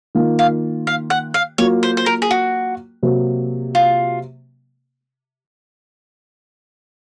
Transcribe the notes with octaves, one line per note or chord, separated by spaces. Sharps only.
D#3 A#3 F4
F5
F5
F#5
F5
F#3 A#3 F4 C#5
C5
C5
A#4
G#4
F#4
C3 F#3 A#3
F4